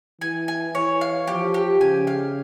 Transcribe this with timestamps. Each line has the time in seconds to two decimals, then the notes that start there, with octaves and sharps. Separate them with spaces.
0.21 E3 G#5
0.48 G#5
0.75 E3 C#5
1.01 F5
1.27 F3 G4
1.54 G4
1.80 C#3 G#5
2.07 F5